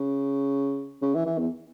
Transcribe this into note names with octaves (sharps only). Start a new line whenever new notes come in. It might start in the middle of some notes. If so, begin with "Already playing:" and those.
Already playing: C#3
C#3
E3
E3
E2